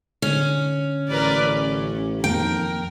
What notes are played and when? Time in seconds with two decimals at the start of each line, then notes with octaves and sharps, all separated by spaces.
0.22 D3 C#4
1.09 A1 A#4 B4 D5
1.49 C#4
2.24 F2 D#3 A#3 A#4 G5